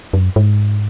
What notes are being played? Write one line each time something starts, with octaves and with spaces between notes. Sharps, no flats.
F#2
G#2